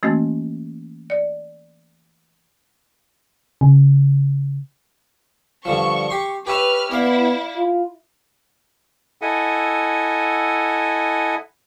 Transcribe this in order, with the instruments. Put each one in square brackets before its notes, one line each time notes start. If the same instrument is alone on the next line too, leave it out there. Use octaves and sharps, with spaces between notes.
[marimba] E3 A3 A#3 C#4 F#4
D5
[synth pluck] C#3
[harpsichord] G2 D3 F3 [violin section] C#6
[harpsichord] G4 C6
[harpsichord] G4 C#5 E5 [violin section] B4 F6
[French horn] B3 [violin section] E4 [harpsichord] D5 F5
[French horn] F4
[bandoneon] E4 A4 D#5 E5 F#5 G#5